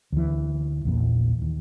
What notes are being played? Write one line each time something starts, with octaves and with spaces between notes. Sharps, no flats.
D2 E3
A#1 E2 A#2
D#2